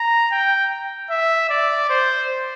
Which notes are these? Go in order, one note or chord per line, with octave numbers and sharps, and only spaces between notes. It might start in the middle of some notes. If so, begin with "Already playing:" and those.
Already playing: A#5
G5
E5
D5
C5